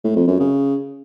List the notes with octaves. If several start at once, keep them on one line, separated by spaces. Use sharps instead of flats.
A2
F2
F#2
C#3